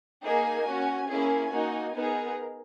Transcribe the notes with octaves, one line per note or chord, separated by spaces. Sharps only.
A#3 D#4 G#4 G#5
C#4 F#4
A#3 C#4 E4 G#4 G#5
A#3 D#4 F#4
B3 D#4 G#4 A#4